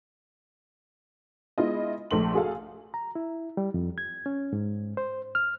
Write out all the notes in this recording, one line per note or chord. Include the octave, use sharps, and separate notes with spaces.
G#3 B3 E4 F4 D#5
A#1 A3 C6 F#7
F#4 G#4 A4 F5
A#5
E4
G3
F2
G#6
C#4
G#2
C5
F6